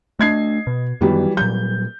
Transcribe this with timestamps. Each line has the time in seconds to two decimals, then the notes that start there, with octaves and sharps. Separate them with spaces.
0.19 A3 D4 D#5 G#6 C7
0.67 B2
1.01 F#2 D#3 E3 F#3 G3 B3
1.37 A#2 F#3 G3 G6